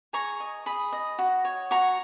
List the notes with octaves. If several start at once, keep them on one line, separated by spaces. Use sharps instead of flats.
G#4 A#5 C#6
D#5
G#4 B5 D#6
D#5
F#4
C#5
F#4 A#5 C#6